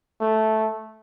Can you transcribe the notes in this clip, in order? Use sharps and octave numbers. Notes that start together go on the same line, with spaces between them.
A3